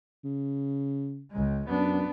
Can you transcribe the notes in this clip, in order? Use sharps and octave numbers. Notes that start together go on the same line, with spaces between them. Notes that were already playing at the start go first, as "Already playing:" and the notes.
C#3
C#2 G#3
F#2 B3 D4